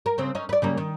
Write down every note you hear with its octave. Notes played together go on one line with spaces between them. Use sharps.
A#4
C#3 C4
C#4 D#4
B4 D5
C#3 G3 A#3
D#3